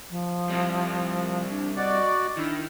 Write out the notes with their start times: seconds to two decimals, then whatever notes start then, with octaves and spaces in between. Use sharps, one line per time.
0.11 F3
0.50 G3 C4 E4
1.50 D4
1.77 F#4 D5 D#5
2.37 D#3 D4 E4